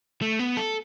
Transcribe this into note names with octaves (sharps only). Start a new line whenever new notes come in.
A3
B3
A4